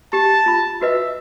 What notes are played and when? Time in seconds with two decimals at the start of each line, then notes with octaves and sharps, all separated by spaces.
0.13 G4 A5
0.46 F4 B5
0.82 F#4 B4 D#5 E5